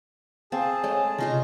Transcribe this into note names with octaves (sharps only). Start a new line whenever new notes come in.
C4 G#4 F5 A5
G#3 A3 C#5
C3 C#4 D#4 F4 A#5 C6